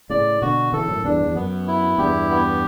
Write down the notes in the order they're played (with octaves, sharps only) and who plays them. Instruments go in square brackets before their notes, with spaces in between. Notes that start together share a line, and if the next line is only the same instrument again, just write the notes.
[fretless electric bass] A2 C#3 [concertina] D5
[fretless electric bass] B2 D3 [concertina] F#4
[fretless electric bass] C#3 E3 [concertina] A4
[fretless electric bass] F#2 A2
[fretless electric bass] E2 G2 [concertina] D4
[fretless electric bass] E2
[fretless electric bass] F#2 [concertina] B3
[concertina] E4
[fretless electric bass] E2 G2 [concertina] G4
[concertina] B3